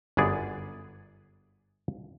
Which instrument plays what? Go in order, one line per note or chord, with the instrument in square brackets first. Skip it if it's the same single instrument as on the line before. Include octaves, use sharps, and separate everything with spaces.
[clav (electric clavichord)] G1 F#2 B3 G#4 D5